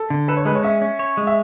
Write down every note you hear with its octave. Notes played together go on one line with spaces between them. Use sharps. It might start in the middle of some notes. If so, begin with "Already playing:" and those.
Already playing: A4
D3
A4 B4
C#5
G#3 B4
C#5
C#4 E5
C#4
C#5
G#3
E5